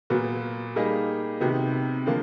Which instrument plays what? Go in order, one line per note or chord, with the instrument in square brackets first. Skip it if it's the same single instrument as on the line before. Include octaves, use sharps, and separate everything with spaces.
[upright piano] A#2 F#3 B3
G3 A#3 D#4 G#4
C3 D#3 F#3 B3
D3 F3 A#3